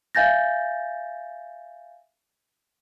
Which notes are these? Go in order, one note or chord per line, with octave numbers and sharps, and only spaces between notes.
E5 F5 G#5 G6 A6 A#6